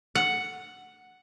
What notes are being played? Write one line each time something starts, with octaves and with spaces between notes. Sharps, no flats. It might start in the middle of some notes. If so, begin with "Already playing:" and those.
F#5